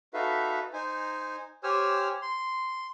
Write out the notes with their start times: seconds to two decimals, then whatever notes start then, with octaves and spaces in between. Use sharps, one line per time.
0.14 D#4 F#4 A4 B4 E5 F5
0.73 D#4 C5 G#5
1.63 G4 C5 C#5 G#5 E6 F6
2.22 C6